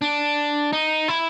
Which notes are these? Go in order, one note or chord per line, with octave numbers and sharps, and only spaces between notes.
D4
D#4
E4